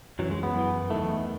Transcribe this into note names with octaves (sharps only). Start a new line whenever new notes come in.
F#2 E3 F#3
G#3
B3
F#2 E3
E2 D#3 A3